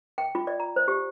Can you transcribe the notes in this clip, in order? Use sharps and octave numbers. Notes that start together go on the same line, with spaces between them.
G5
F4
D5
A#5
C5
G4